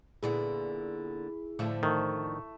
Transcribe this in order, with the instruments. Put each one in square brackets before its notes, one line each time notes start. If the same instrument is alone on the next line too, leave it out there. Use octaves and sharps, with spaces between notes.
[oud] A#2 D3 B3 [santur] E4 [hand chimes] G#4
[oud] A2 D3 F3 [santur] E5
[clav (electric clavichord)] D#3 [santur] A3 [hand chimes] C#6